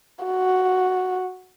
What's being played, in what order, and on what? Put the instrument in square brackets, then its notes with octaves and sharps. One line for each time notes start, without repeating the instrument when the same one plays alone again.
[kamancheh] F#4